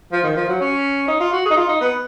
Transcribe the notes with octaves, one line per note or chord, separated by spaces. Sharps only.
F3
D#3
F3
F#3
C#4
D#4
F4
F#4
G#4
D#4
F4
D#4
B3